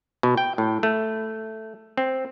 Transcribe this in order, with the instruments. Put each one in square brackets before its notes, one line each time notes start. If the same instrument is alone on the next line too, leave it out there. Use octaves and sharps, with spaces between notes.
[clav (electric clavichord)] B2
G5
A2
A3
C4